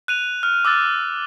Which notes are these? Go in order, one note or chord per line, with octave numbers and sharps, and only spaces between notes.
F#6 D#7 F7
F6
D6 E6 F#6 A6